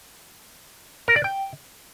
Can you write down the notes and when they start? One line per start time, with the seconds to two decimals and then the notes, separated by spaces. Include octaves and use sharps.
1.08 A#4
1.16 D5
1.24 G5